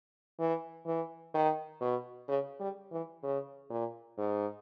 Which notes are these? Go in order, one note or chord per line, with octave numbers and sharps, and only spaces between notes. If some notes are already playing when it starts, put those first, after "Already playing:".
E3
E3
D#3
B2
C#3
G3
E3
C#3
A#2
G#2